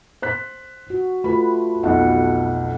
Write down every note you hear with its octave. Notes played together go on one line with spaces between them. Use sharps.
C5 F#6 B6
F#4
A3 F4 B4 B5
B1 F2 B2 F#5